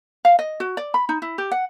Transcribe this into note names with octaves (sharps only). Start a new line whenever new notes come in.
F5
D#5
F#4
D5
B5
D#4
E4
G4
F#5